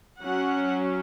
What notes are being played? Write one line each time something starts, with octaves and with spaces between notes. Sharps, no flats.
F#3 C#4 F#5